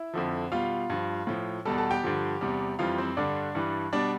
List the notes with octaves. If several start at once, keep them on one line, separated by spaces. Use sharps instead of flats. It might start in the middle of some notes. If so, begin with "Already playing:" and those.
Already playing: E4 E5
F2 D3 F3
B2 G3 F4 F5
G2 F3
A2 F3
E2 B2 G3 A4 A5
A4 A5
G4 G5
G2 D3 F3
E2 C3 G3
F2 E3 G3 F4 F5
C4 C5
G2 D3 G3 D4 D5
G2 E3 G3
B2 G3 D4 D5